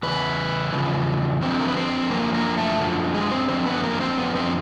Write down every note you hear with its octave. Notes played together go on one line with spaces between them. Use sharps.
E2 C#3 B4
E2 C#3 F3
F#2 D3 F3 C4 C5
A#4
B4
C4 C5
F#2 D3 F3 A#3 A#4
A#3 A#4
A3 A4
F#2 D3 F3
G#3 G#4
C4 C5
F#2 D3 F3 C4 C5
B3 B4
A#3 A#4
C4 C5
F#2 D3 F3 B3 B4
C4 C5